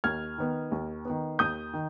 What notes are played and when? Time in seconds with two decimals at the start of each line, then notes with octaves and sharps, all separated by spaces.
0.04 D#2 F6 G#6
0.38 D#3 B3
0.72 D#2
1.05 D#3 B3
1.39 D#2 D#6 G6
1.74 D#3